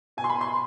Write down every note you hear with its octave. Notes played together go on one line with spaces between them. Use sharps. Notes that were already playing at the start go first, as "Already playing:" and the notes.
B2 G#5
C6
B5
C6